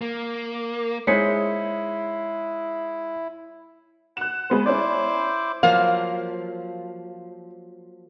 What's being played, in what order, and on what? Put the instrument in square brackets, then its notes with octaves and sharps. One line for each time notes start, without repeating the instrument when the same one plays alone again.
[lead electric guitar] A#3
[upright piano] G#3 [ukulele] D#4 G#4 C5 [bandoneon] E4 [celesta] C#5 B6 C#7
[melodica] F#5 [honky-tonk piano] F#6 E7
[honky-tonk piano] G#3 B3 C5
[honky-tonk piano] C#4 D5 [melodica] E4 C5 D6
[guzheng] F3 F#3 A#3 [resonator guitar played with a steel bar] F5